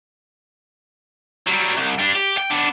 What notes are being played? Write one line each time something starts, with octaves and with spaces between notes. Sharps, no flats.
F#3 G3
C2
G3 D4
G4
G5
B3 D4